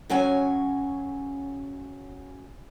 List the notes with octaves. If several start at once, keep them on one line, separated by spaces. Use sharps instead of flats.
C#3 F#3 C#4 G#5